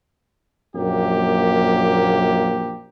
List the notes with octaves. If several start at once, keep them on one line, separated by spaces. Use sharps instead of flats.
A#1 F#2 A#3 G4